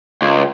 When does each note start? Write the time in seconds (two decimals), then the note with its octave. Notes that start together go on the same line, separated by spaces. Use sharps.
0.22 C#2